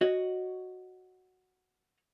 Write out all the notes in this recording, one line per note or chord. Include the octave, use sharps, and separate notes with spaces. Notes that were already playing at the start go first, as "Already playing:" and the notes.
F#4 C#5 D#5